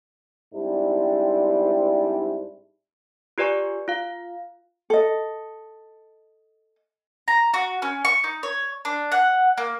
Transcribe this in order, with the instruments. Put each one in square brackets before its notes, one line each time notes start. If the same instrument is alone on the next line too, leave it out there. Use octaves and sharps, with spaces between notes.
[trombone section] G#2 G3 C4 D4 E4
[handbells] F4 G4 B4 D5 G#5 C#6
F4 F5
[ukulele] A4 D#5
[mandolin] A#5
F#4
C#4
C#6
D#4
C#5
D4
F#5
A#3